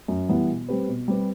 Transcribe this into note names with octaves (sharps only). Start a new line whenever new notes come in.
F#2
E3 G3 B3 E4
B2
G3 C4 G4 B4
B2
G3 C4 G4 B4